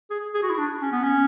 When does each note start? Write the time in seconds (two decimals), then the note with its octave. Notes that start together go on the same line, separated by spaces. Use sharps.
0.10 G#4
0.34 G#4
0.43 F#4
0.50 E4
0.58 D4
0.82 C#4
0.92 B3
1.03 C#4